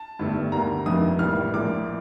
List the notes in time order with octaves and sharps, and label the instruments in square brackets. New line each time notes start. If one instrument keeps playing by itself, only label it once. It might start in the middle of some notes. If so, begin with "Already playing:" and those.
Already playing: [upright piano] A5
G1 G2 D#3 A3
D2 D3 G3 A#3 A#5
F1 F2 C3 D#3 A#3 D#6
A1 A2 G3 A#3 F6
A#1 A2 F3 A#3 D6